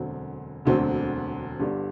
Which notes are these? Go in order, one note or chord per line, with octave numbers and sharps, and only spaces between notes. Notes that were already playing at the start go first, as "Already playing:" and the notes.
Already playing: E1 D2 D3 F#3 C4
E1 D2 D3 F#3 C4
G1 G2 D3 G3 D4